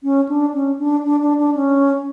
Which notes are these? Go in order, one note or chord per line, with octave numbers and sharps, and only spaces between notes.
C#4
D4
C#4
D4
D4
D4
D4
C#4